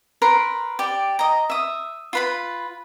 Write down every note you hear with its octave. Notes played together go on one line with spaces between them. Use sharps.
A#4 B4 C6
G4 D5
D#5 A#5
E5 D#6
F4 B4 B5